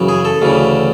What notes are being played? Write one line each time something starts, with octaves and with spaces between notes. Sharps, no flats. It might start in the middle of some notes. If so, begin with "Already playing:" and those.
Already playing: F#2 C#3 E3
G#4
A4
D2 C#3 E3